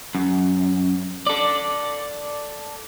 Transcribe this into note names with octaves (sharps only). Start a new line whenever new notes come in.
F#2
A4 D5